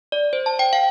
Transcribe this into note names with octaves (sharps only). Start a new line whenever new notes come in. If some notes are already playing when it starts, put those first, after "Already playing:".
D5
C5
A5
G5
F5